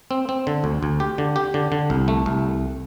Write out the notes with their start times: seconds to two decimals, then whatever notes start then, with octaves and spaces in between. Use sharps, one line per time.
0.11 C4
0.29 C4
0.47 D3
0.64 D2
0.83 D2
1.00 G4
1.18 D3
1.36 G4
1.54 D3
1.72 D3
1.90 C2
2.08 A3
2.26 C2